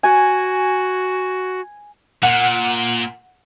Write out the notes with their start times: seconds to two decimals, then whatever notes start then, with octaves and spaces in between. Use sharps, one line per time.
0.03 F#4 G#5
2.23 A#2 F#5